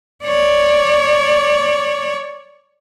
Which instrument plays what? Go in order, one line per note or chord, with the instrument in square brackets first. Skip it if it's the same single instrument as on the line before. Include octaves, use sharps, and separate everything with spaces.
[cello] C#5 D5